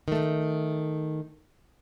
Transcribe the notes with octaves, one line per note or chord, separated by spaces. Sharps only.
D#3 A3